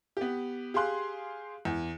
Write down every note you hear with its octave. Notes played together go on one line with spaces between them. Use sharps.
B3 G4
G4 G#4 F5 C6 F#6
E2